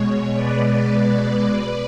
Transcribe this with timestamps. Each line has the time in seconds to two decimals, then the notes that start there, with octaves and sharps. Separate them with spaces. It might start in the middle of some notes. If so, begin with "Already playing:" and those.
Already playing: B2 G#3 C#5
0.34 B4 D5